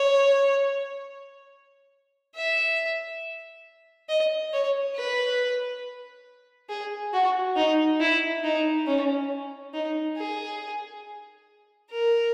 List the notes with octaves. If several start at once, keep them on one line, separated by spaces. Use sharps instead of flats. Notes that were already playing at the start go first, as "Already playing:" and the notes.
Already playing: C#5
E5
D#5
C#5
B4
G#4
F#4
D#4
E4
D#4
C#4
D#4
G#4
A#4